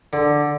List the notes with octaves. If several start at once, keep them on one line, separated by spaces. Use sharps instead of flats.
D3